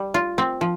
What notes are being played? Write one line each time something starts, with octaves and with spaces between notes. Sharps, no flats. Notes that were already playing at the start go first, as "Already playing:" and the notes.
Already playing: G3
F4
C4
F3